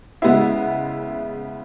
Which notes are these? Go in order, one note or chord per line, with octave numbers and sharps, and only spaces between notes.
C#3 G#3 B3 E4 E5